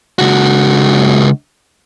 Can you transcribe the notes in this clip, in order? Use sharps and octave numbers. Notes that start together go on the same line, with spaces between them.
C#2 F#4